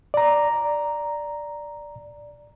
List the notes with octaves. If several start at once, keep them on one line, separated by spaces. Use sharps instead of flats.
D5 A#5